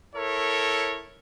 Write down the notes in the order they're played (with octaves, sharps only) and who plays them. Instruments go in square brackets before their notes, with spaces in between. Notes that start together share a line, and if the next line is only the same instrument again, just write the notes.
[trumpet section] E4 A4 A#4 C#5